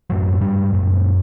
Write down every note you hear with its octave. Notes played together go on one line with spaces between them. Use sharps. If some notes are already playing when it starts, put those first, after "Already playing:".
F#2 A2 F#3
A2
G2 G3
A2
F#2 A#2 F#3
A#2